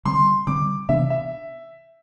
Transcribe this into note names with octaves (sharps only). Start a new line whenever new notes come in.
D3 G3 C4 C6
D3 G3 C4 D6
C3 E3 B3 D4 E5
E5